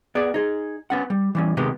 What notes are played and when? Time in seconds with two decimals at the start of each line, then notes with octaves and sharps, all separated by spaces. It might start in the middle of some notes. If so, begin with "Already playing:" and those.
0.15 B3 G#4 D5
0.34 D#4 G#4
0.90 B3 C#4 F#5
1.10 G3
1.35 E3 G3 C#4
1.57 C3 D#3 G#3 B3 D#4 G4